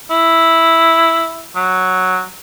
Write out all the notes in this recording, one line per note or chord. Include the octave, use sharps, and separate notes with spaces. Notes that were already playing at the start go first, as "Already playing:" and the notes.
E4
F#3